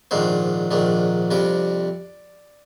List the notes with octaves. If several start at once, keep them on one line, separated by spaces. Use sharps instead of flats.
A#1 G#2 D#3 G#3 D4 C5
A#1 G#2 D#3 G#3 D4
F2 C3 G3 D4 D5